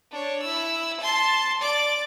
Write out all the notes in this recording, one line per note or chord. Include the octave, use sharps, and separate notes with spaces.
D4 C#5
E4 E6
A5 C6
D5 D6